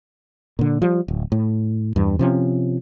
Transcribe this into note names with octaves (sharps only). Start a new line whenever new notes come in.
A#2 D3
F3 G3
D1
A2
E2 G2
C3 F3 C#4